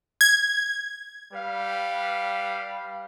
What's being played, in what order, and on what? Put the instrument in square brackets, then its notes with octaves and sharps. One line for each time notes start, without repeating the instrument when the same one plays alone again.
[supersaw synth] G#6
[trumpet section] G3 B4 F5